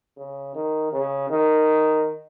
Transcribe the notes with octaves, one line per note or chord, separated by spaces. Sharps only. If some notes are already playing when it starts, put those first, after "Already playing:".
C#3
D#3
C#3
D#3